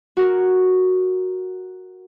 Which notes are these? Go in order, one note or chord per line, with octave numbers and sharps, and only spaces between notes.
F#4 A#4